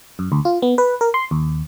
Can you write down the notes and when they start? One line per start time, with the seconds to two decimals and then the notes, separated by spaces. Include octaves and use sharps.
0.19 F#2
0.32 D2
0.45 F4
0.62 B3
0.78 B4
1.01 A#4
1.14 C6
1.31 D#2